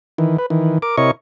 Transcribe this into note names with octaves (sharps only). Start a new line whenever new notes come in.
D#3 E3
B4
D#3 E3
A#4 D6
C3 E4 A#4 C#5 D#5 C#6